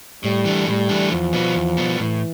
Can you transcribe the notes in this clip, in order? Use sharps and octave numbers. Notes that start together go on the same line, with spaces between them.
A2 G3
E3 A3 D4
A2 G3
E3 A3 D4
E2 F3
B2 G3 B3
E2
B2 G3 B3
A2 E3